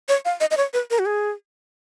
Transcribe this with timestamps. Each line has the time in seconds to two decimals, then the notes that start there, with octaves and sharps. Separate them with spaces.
0.09 C#5
0.25 F5
0.41 D#5
0.51 D#5
0.57 C#5
0.73 B4
0.90 A#4
0.99 F#4
1.06 G#4